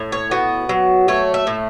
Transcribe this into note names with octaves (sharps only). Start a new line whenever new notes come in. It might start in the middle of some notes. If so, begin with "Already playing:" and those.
Already playing: A2
C#5
B3 F#4
F#3
A3 C#5
E5
A2